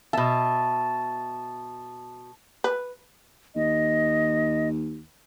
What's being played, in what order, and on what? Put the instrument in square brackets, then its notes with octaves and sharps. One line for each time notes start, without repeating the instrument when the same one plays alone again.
[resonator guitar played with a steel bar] B2 E5 [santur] A5
[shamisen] B4
[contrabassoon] D#2 [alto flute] D#5